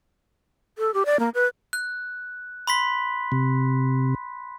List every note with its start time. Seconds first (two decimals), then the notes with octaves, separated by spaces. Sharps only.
0.78 A4
0.94 G4
1.06 D5
1.20 A#3
1.35 B4
1.73 F#6
2.67 B5 C6 B6
3.32 C3